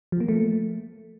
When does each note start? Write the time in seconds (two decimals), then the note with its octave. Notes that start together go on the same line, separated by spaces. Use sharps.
0.12 F3
0.20 A#3
0.28 A3